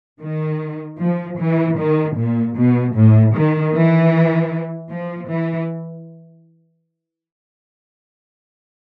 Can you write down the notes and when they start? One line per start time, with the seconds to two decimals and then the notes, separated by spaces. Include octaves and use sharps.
0.22 D#3
1.01 F3
1.40 E3
1.79 D#3
2.18 A#2
2.57 B2
2.96 A2
3.35 D#3
3.75 E3
4.92 F3
5.31 E3